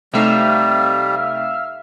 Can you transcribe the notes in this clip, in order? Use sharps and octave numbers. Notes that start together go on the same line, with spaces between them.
C3 G3 A3 D#4 E5 F5 F6